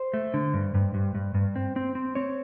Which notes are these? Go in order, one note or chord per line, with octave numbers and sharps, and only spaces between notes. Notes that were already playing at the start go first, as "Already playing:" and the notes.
Already playing: C5
A3
D3
G2
G2
G2
G2
G2
C4
C4
C4
C4 C#5